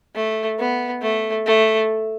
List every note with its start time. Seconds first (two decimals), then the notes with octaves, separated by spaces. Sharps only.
0.15 A3
0.59 B3
1.02 A3
1.46 A3